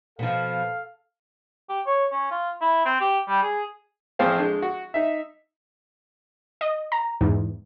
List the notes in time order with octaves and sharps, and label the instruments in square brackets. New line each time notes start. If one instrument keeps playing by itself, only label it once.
[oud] B2 F3 [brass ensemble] A4 F5
[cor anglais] G4
C#5
C#4
F4
E4
C4
G4
G3
G#4
[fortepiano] A1 F3 C4 G#4 C5 F5
D3 G#3
F#4
D#4 E5
[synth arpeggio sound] D#5
A#5
E2 G#2